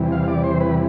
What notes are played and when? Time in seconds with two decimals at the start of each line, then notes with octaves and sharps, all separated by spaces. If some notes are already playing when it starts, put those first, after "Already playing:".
Already playing: E2 C3 E3 G3
0.12 F5
0.28 D5
0.44 C5
0.61 B4